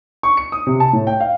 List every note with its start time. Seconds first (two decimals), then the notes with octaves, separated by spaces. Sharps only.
0.23 C#6
0.37 C#7
0.52 D#6
0.67 C3
0.80 A5
0.93 A2
1.07 G5
1.20 F5